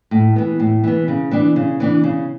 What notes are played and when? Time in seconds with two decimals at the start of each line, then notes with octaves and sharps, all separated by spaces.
0.11 A2
0.36 E3 B3
0.60 A2
0.84 E3 B3
1.08 C#3
1.31 E3 B3 D4
1.56 C#3
1.80 E3 B3 D4
2.04 C#3